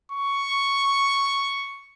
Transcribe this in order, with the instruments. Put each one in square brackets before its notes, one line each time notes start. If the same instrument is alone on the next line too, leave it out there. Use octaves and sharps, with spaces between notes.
[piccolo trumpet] C#6